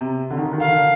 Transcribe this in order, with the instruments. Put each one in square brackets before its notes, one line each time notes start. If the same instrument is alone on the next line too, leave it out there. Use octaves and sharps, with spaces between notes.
[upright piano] C3
D3
D#3
D3
D#3
[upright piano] D3 [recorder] F5
[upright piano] D#3
D3